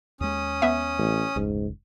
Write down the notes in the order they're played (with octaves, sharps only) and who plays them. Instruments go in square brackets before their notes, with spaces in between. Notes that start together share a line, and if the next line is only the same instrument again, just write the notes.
[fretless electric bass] D#2 G#3 [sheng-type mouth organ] C#4 D#6
[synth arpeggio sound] B3 E5
[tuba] A1
[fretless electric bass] F1 C#2 [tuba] G#2